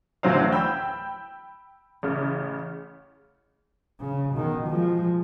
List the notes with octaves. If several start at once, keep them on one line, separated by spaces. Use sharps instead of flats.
D2 A2 E3 F#3 C5 F5
G5 B5 E6 G6
A1 C#3
C#3
B2 D#3
F3 G#3